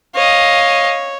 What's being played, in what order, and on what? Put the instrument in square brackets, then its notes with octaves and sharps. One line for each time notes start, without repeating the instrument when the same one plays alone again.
[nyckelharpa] C#5 [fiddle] D#5 F5